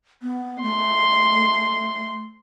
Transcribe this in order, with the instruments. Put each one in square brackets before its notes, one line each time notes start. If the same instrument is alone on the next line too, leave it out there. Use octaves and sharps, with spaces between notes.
[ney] B3
[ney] A3 [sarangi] C6